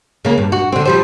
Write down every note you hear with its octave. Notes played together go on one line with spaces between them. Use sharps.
C#3 A#3
G2
F#4
D3 C4
F3 G3 C5